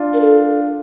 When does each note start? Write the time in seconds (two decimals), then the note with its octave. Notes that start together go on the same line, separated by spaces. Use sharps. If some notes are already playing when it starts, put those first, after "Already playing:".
Already playing: D4 F4
0.14 A#4
0.21 A4